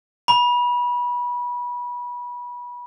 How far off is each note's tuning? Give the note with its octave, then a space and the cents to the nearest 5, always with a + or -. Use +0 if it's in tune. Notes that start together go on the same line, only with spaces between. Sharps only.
B5 -25